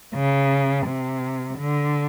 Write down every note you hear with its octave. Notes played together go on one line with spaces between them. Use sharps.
C#3
C3
D3